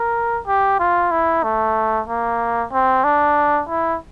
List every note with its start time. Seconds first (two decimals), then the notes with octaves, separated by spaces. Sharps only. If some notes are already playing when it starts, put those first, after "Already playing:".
Already playing: A#4
0.47 G4
0.79 F4
1.11 E4
1.44 A3
2.08 A#3
2.72 C4
3.04 D4
3.69 E4